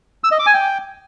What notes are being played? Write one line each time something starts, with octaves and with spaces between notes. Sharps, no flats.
E6
D#5
D6
G#5
G5